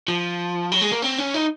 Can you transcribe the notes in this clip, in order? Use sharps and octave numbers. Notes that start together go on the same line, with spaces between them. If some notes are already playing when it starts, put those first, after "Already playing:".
F3
F#3
G#3
A#3
C4
C#4
D#4